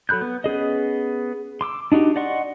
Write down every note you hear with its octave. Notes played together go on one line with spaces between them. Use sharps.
F#3 A4 B5 F#6 G6
B3
B3 C#4 G#4 D#5
C6 D6 E6
D4 D#4 F#4 G4
D5 D#5 F#5 C6 C#6